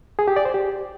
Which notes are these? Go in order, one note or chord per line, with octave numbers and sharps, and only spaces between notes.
G#4
G4
D5
C5
G4